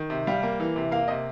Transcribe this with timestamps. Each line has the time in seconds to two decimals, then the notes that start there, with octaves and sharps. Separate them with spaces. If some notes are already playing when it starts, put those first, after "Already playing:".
Already playing: D#3
0.10 C3
0.27 G3 F5
0.43 A#3
0.60 E3
0.76 C3
0.91 A#3 F5
1.08 C3 D#5